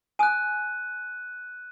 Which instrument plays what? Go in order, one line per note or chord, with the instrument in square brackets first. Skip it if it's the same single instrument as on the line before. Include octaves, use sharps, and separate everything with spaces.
[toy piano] G#5 D#6 [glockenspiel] F#6 D#7